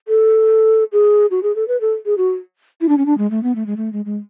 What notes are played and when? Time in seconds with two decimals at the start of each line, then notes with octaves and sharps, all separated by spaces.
0.08 A4
0.93 G#4
1.31 F#4
1.43 G#4
1.56 A4
1.68 B4
1.81 A4
2.06 G#4
2.18 F#4
2.81 E4
2.89 D4
2.98 C#4
3.06 D4
3.18 G#3
3.31 A3
3.43 B3
3.55 A3
3.66 G#3
3.77 A3
3.93 G#3
4.05 G#3